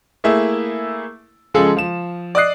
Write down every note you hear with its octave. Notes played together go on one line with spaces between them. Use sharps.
A3 A#3 E4 G#4 E5
C#3 F3 G#3 G#4 A4
F3 E7
D5 D#5 D#6 F#6 C7